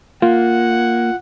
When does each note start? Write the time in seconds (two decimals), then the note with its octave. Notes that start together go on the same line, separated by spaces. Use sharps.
0.22 A#3 F4 F#5